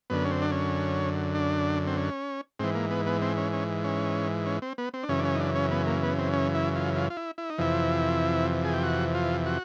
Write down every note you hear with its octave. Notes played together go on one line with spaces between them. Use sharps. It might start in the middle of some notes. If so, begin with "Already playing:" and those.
F#2 D3 B3
C#4
C4
D4
C#4
D4
C4
C#4
G#2 E3 C4
A#3
B3
B3
C4
C#4
C#4
C#4
C#4
C4
B3
C4
D4
F#2 C#3 E3 C#4
D4
C#4
D#4
D4
C#4
B3
A#3
B3
C4
C#4
E4
F4
F4
F4
E4
E4
D#4
F2 C3 E3 E4
G#4
G4
F#4
F4
F#4